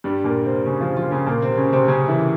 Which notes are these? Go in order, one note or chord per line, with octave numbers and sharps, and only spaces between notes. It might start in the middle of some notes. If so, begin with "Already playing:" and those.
G2 G3
A#2 A#3
C3 C4
C#3 C#4
F3 F4
F3 F4
C#3 C#4
A#2 A#3
C3 C4
C#3 C#4
C3 C4
C#3 C#4
E3 E4